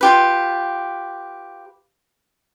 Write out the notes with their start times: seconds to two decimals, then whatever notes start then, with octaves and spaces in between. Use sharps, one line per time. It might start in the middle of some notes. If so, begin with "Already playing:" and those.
0.01 F4 G4 B4